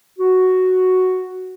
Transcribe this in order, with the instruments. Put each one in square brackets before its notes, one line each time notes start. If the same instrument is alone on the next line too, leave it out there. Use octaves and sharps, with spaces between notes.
[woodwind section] F#4